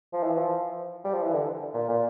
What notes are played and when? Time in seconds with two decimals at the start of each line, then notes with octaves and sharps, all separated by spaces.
0.13 F3
0.23 E3
0.37 F3
1.05 G3
1.13 F3
1.23 E3
1.33 D3
1.74 A#2
1.89 A#2